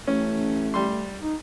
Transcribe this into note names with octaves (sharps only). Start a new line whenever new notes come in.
A1 A3 C#4
G3 C6
D#4